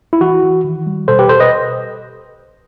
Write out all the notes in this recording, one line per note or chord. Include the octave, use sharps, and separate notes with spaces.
E4
E3 F#4
E3
D#3
G3
B2 A4 C5
G4 B4
B2 A4 C5
B4 D#5